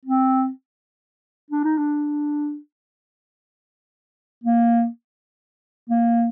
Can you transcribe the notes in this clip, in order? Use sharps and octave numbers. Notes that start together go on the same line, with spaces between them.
C4
D4
D#4
D4
A#3
A#3